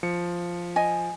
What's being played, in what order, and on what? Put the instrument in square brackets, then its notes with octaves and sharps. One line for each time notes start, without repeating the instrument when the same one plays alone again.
[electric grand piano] F3 C#7
[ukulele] D#5 G#5